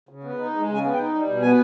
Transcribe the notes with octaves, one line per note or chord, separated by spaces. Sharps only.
C#3
B3
D#4
G#3
C#3
G#5
B3
G5
D#4
G3
B2
B3 G#5